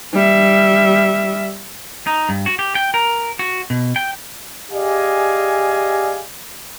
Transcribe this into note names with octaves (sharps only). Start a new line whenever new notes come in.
G3 E5
D#4
G2
F#4
G4
G5
A#4
F#4
B2
G5
G4 G#4 D5 D#5 F5 G#5